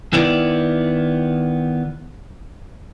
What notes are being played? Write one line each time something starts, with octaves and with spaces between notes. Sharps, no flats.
D#3 B3 E4 D5